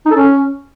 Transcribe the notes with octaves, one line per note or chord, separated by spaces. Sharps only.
D#4
A4
C#4